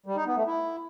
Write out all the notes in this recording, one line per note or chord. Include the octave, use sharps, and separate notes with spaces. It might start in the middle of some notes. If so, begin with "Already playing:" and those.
G3
D#4
B3
A3
E4